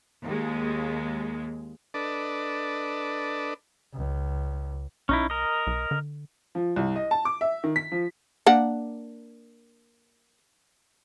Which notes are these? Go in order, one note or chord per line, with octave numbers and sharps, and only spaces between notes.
D#2 G#3
D4 A4 B4 D5 D#5
C#2
B1 C#4 D#4 E4
A#4 D#5
B1
D3
F3
C2
D#5
A5
D6
E5
D#3
B6
F3
A#3 D4 F#5